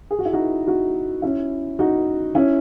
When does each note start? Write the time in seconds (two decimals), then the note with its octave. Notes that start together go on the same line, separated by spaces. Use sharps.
0.11 G#4
0.19 F#4
0.25 E4
0.33 D#4 F#4
0.67 D#4 F#4
1.22 C#4 E4
1.79 D#4 F#4
2.35 C#4 E4